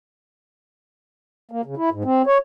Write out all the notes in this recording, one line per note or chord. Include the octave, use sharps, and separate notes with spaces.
A#3
C#3
E4
G#2
C4
C#5